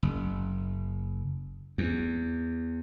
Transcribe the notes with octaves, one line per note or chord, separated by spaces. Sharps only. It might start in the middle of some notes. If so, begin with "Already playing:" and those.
F#1
E2